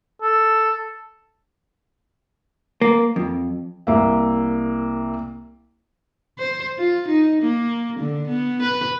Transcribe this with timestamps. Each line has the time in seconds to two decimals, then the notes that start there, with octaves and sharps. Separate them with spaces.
0.22 A4
2.81 A#3
3.16 F2
3.87 C2 A#3 E5
6.39 C5
6.78 F4
7.08 D#4
7.43 A#3
8.00 D3
8.28 B3
8.62 B4